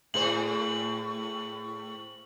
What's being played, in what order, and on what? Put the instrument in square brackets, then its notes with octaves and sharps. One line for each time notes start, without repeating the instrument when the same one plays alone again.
[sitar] A2 G#4 C5 [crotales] F#7